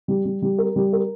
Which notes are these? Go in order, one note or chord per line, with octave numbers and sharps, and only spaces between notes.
G3
G3
G3
A#4
G3
A#4